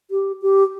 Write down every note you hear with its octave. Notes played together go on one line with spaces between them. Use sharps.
G4
G4